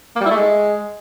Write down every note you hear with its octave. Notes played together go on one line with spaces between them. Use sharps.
A#3
G3
E4
A3
G#3